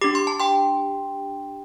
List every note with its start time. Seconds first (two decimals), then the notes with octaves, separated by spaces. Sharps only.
0.01 D4 G4 D6
0.15 C6
0.27 A5
0.40 G5 C6